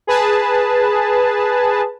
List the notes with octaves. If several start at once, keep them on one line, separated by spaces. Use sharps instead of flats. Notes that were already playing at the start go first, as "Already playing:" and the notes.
G#4 B4 A5